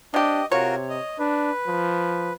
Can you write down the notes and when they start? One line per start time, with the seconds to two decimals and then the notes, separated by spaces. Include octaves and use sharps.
0.14 C3 D4 G4 D#5
0.52 C3 F4 F#4 A#4 C#5
0.89 D#5
1.19 D4 B4
1.67 F3